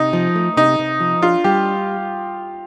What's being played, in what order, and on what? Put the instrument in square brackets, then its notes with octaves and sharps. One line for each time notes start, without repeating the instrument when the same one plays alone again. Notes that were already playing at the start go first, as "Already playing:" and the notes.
Already playing: [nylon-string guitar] C3 [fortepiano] D#4
[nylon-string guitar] F3
A3
[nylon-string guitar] C3 [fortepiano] D#4
[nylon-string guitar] C3
F3
[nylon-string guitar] D4 [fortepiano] F4
[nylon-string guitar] G3 [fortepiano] G4